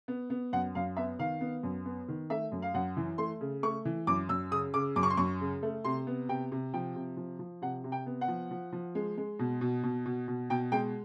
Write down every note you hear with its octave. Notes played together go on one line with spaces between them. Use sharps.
B3
B3
F#2 F#5
F#2 F5
B3 E5
D#3 F5
B3
F#2
B3
D#3
A3 E5
F#2
F5
F#2 F#5
E3
A3 C6
C#3
A3 C#6
E3
F#2 D6
F#2 E6
C#3 D#6
C#3 D6
F#2 D6
C#6
C6
F#2 C#6
C#3
A3
C3 C6
B3
C3 G5
C3
F3 G5
C3
F3
F3
C3 F#5
C3
G5
B3
F#5
F3
F3
F3
G#3
G#3
B2
B2
B2
B2
B2
B2 G5
G#3 G5